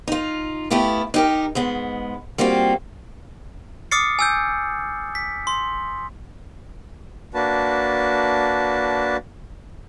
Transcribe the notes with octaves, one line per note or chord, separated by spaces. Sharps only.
D#4 F4
A3 B3 E4 F4 G4
D#4 G4 A#4
G#2 G#3 B3
G3 A#3 C4 F4 F#4
D6 D#6 F6 A6 C7 C#7
G#5 E6 G6
B6
C6
A#3 D4 F#4 B4 A5